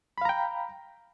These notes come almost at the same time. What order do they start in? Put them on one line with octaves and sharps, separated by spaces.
B5 F5 A#5 G5